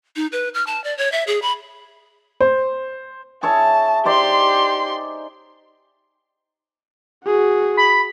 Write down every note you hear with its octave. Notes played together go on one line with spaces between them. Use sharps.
D#4
B4
F6
A5
D5
C#5
E5
G#4
B5
C5
G#4 C#5 E5 A5
D#4 G4 C5 D5 C6
F#4 G#4
B5